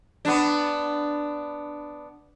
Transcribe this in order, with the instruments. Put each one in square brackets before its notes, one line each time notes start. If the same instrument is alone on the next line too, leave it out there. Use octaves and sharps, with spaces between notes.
[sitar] B3 D4